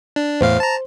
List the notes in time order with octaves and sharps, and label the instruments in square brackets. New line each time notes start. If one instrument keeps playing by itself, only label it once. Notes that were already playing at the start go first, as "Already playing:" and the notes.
[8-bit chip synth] D4
[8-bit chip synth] E2 A2 F5 [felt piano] C5
[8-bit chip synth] A5 A#5